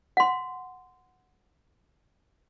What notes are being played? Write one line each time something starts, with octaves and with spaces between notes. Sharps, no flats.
F#5 C6